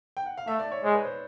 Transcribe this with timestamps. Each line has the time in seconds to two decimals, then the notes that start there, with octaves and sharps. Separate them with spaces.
0.17 G5
0.26 F#5
0.37 F5
0.47 A3 E5
0.59 D5
0.72 C#5
0.83 G#3 C5
0.94 B4
1.05 C5